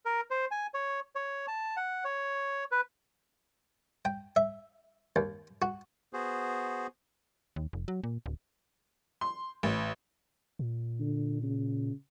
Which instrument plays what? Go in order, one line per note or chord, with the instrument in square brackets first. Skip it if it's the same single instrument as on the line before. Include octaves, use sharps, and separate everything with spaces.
[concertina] A#4
C5
G#5
C#5
C#5
A5
F#5
C#5
B4
[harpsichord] G5
E5
D#2
F#4
[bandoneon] B3 F#4 G#4 C5
[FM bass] D#2
F1
F#3
A#2
D1
[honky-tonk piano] C6
A1
[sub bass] A#2
[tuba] D3
C#3